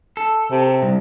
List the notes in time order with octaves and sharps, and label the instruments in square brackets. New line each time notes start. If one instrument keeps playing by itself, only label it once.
[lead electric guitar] A4
[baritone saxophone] C3
[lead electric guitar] C2